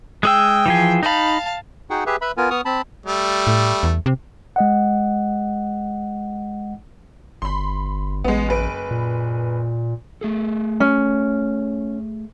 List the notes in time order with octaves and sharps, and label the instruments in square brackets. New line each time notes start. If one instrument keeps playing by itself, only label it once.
[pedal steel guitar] G#3 G#4 E6 [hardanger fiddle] G5
[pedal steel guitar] E3 F3 G#4
[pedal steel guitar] D#4 B5 [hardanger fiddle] F5 A5
[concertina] D#4 F#4 G#4 F#5 G5
G4 G#4 B4 E5
B4 E5 B5
B3 F4 A#4 G#5
B3 C#6 D#6 F6
C4 A5 B5
[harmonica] G3 A3
[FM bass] A2
E2
C3
[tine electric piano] G#3 D#5 F#5
[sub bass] G1 [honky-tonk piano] B5 C6
[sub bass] A1 [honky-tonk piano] G#3 B3
[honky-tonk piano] F#1 B4 D7
[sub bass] A#2
[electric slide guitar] A3 G#4 A4
[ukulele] C#4